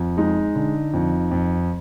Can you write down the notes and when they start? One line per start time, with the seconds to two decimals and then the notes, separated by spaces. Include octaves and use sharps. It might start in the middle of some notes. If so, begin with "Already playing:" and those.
Already playing: F2
0.17 G#3 D#4
0.55 D3
0.93 F2
1.31 F2